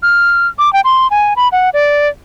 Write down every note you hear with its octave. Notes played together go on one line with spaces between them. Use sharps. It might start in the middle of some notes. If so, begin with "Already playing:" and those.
F6
D6
G5
C6
G#5
B5
F#5
D5